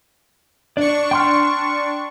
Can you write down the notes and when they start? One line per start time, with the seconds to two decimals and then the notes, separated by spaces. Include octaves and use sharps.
0.77 D4 D5 C#6
1.11 G5 C6 F6